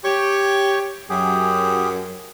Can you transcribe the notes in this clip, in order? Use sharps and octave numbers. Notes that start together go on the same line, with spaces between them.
G4 C#5 C#6
F#2 F#3 G4 G#4